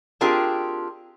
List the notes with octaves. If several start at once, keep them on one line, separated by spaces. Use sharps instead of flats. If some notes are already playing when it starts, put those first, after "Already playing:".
C4 D4 F4 G4 G#4 A#4